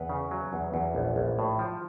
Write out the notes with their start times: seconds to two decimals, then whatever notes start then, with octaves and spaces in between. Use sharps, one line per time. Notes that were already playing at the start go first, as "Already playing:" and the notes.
Already playing: E2 B4
0.10 C#3
0.31 F#3
0.53 E2
0.74 E2
0.95 A#1
1.16 A#1
1.39 A2
1.59 F3